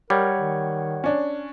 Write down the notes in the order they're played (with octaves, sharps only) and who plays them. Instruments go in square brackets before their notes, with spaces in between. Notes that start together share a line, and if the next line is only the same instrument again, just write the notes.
[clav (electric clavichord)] G3 [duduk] A#4 [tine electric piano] C#5 F#5 G#6
[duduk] D#3
[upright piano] C#4 D4